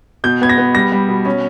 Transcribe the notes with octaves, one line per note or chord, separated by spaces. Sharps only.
B2 G6
B3 G#6
A#6
B3
G3 A#6
G3
B2
C#4